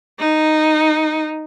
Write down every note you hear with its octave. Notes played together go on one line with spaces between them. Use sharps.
D#4